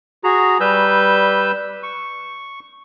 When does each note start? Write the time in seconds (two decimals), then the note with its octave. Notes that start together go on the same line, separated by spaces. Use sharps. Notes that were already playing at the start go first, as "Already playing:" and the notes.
0.24 F#4 G#4 A#5
0.60 G3 B4 E6 G6
1.83 C#6